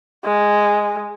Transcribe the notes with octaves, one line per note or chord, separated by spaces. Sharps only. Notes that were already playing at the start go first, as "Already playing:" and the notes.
G#3